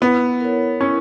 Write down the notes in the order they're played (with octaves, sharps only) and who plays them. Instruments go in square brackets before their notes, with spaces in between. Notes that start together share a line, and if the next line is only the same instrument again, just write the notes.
[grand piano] B3 [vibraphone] E4
[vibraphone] A#4 C#5
[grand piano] C#4 [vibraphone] E4